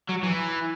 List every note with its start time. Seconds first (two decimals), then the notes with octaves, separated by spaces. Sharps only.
0.09 F#3
0.23 E3